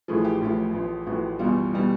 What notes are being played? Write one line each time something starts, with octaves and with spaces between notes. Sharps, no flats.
A1 A2 F3 G#4
G4
A1 A2 F3
A1 A2 F3
A1 A2 F3 F#4
E2 B2 G3 F4
B2 G3